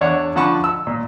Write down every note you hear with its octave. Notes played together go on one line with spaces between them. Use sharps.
E2 D4 C#5 F#5
D3 F3 F#5 A5 B5 C#6
E6
A#2